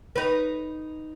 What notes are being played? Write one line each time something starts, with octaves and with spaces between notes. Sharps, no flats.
D#4 B4